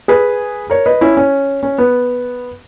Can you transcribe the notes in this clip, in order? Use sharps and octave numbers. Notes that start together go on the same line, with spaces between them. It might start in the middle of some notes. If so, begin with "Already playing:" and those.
G#4 B4
A#4 C#5
B4 D#5
C#4 E4
C#4
C#4
B3